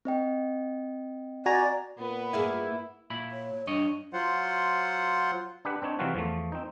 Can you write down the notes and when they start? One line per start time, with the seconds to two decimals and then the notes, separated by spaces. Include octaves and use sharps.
0.05 C4 D#5 G5
1.46 F#4 D5 G#5 A#5
1.98 A#2 B3 B4
2.33 G2 A#3 E4 G#4
3.10 A#2 E4 B5
3.32 C#5
3.67 G2 D4 C#5 D#5
4.13 F#3 F4 C5 F#5
5.65 D4 G4 B4 F#5
5.82 C4 D4 D#4 C#5
5.99 C3 E3 F#3 C4 F4 F#4
6.15 E2 F3 A3
6.52 C4 D#4